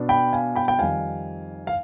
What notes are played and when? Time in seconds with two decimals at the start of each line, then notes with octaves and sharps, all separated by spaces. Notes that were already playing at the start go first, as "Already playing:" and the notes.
Already playing: B2 B3 D4
0.09 G5 B5
0.33 F5 G#5
0.55 G5 B5
0.68 G5
0.79 F2 D#3 G3 C4 D#4 F5 G#5
1.67 F5